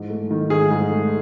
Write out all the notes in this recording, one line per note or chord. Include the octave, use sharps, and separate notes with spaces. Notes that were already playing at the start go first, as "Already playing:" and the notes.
Already playing: G#2 E3
A3
D#3
G#2 G#4
G#2
A3